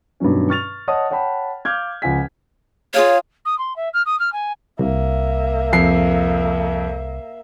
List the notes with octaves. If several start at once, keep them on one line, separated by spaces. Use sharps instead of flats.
G2 B2 D#3 F#3 C#4
C#6 F6 A6 F7
C#5 D#5 F#5 A5 D#6
C#5 F#5 G5 A5 B5
F5 D6 F6 G6 G#6
C#2 F3 F4 F#5 G#5 B6
F4 G#4 C#5 F5
D#6
C6
E5
F6
D#6
F6
G#5
C2 A#3 E5
F2 C7